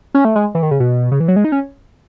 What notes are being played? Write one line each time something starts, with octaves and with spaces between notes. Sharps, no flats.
C#4
A3
G#3
E3
D#3
C#3
B2
C#3
E3
F#3
G#3
D#4
C#4